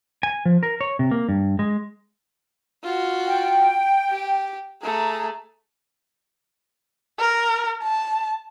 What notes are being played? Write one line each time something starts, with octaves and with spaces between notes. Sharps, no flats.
G#5
F3
A#4
C#5
C3
A#3
G2
G#3
F4 F#4
G5
G4
A3 G#4 A#5
A#4
A5